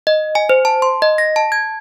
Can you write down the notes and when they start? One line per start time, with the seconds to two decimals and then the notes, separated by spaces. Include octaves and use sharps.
0.07 D#5
0.35 G#5
0.49 C5
0.65 A5
0.82 C6
1.02 D#5
1.18 A#6
1.36 A5
1.52 G#6